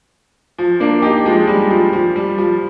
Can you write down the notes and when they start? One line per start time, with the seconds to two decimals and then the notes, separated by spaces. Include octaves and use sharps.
0.58 F3
0.80 A#3 D4
1.02 D#4 G4
1.25 F3 G#3
1.47 G3
1.70 F3
1.93 F3
2.16 G3
2.38 F3